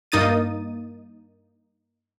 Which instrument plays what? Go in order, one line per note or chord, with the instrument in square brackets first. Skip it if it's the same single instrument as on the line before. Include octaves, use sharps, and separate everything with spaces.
[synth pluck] G2 A#3 D#4 D#6 A6 D#7